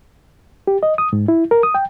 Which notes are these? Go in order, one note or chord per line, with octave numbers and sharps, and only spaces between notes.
G4
D#5
D#6
G#2
E4
A#4
D#6
G5